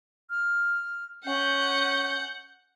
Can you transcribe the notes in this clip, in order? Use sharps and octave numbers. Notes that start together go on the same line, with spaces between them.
F6
C#4 F#5 G6